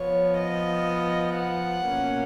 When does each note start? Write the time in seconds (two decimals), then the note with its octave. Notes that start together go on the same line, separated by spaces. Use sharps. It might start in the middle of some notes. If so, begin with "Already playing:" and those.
Already playing: F3 B3 C#5
0.38 D#5
1.37 F#5
1.87 B2 A#3 C#4